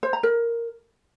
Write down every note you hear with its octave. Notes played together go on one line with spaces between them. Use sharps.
C5
A#5
A#4